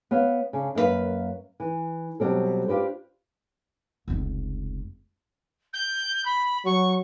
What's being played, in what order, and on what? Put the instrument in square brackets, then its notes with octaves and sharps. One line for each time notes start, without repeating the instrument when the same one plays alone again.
[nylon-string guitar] B3 C#5 F5
C#3 D4
F#2 A#3 D#4 B4 F5
E3
B2 F#3 G3 C4 A4
D4 F4 G4 B4 C5
[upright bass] F1 C#2
[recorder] G6
B5
[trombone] F#3 [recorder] C#6